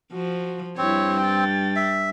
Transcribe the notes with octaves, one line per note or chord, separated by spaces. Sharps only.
F3 F#4
G2 C4 E4 C#5
G5 A6
E5